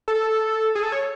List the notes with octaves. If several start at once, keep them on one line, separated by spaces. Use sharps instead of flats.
A4
G#4
A4
C#5